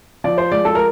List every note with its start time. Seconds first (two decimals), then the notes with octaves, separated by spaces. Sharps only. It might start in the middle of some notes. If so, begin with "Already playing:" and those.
0.24 F3 D5
0.38 C5
0.52 G#3 D5
0.65 A4
0.75 A#4